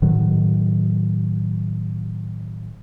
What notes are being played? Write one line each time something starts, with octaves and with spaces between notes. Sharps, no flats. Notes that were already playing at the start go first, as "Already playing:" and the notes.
A2 D#3 F#3